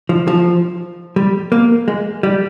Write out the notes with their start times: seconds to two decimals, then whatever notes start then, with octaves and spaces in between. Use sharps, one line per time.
0.09 F3
0.28 F3
1.16 G3
1.52 A#3
1.88 G#3
2.23 G3